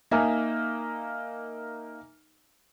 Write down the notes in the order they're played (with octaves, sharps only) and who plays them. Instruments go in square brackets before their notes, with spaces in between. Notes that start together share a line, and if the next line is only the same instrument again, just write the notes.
[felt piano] A#3 D#4 E5 G#5